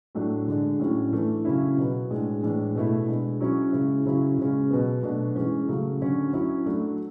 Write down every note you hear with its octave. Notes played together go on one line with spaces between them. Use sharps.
A2 F#3 A3 D4
D3 G#3 D4
A2 F#3 C#4 E4
E3 A3 D4
C#3 F#3 C#4 E4
B2 F#3 B3
A2 G#3 D4
A2 E3 G#3 D4
B2 A3 E4
B2 G#3 D4
F#3 C#4 E4
C#3 G#3 C#4 E4
C#3 F#3 C#4 E4
C#3 G#3 C#4
B2 F#3 B3
B2 F#3 A3 D4
E3 G#3 C#4
C#3 F#3 A3
D3 F#3 C#4
F#3 C#4 E4
F#3 A3 D4